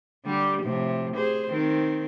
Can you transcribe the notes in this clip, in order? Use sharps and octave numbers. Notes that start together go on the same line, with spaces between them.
D3 G3 G4
A2 C3 F3
G#4 C5
D#3 C4